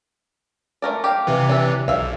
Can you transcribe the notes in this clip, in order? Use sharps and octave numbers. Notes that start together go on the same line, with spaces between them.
A3 A#4 D5
G4 F5
C3 E3
D4 E5
B1 E5 F5